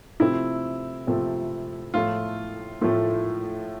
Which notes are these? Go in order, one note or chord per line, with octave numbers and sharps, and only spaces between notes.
C3 F3 A3 C4 E4
C3 F3 A3 C4
A2 F3 A3 F4
A2 F3 A3